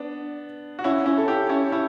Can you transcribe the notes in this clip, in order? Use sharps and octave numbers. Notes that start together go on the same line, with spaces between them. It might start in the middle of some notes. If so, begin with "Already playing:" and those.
Already playing: B3 D4
F#4
C#4 E4
C#4 E4
A4
E4 G4
C#4 E4
C#4 E4